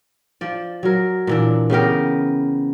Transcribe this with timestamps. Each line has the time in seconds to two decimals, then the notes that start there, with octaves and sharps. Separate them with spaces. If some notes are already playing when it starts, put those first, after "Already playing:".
0.41 F3 D5
0.83 F#3 A#4
1.27 A#2 E3 D4
1.70 C#3 B3 G4 A#4